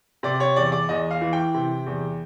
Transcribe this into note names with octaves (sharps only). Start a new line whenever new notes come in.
C3 D5
C#5
E2 D5
D5
E2 D#5
F5
E3
G5
C3
E2